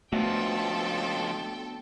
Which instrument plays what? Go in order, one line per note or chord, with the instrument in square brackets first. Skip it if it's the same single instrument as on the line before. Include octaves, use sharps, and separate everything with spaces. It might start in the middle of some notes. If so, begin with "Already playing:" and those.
[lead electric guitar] C#2 F3 [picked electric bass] A3 [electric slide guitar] B3 D4 F#4 [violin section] A4 G5